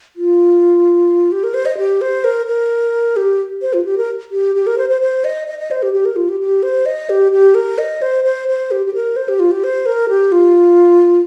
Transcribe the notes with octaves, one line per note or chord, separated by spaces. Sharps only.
F4
G4
A#4
C5
D#5
G4
C5
A#4
A#4
G4
C5
F4
G4
A#4
G4
G4
A#4
C5
C5
C5
D#5
D#5
D#5
C5
G4
G4
A#4
F4
G4
G4
C5
D#5
G4
G4
A#4
D#5
C5
C5
C5
G4
G4
A#4
C5
G4
F4
G4
C5
A#4
G4
F4